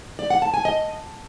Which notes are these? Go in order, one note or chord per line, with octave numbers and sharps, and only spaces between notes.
D5
F#5
A5
G#5
D#5